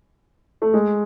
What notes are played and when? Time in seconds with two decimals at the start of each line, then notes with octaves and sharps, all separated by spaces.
0.62 A3
0.73 G#3